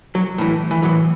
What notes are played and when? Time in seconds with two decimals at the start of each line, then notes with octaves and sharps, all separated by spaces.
0.15 F#3
0.38 A2 E3
0.71 E3
0.82 A2 E3 F#3